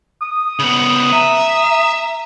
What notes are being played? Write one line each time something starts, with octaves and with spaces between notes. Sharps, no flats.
D#6
C#3 B3
E5 A#5